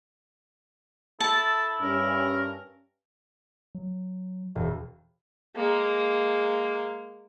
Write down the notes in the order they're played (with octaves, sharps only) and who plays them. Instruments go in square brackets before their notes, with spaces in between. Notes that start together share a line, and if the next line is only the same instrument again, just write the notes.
[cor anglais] E4 [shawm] A4 [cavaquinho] A5
[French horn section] G2 C#4 [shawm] A#4
[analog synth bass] F#3
[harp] E1
[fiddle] G#3 A#3